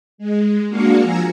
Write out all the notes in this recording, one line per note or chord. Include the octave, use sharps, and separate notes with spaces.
G#3
G#3 A#3 D4 F#4 F5 C#7
F3 G#5 A#5 E6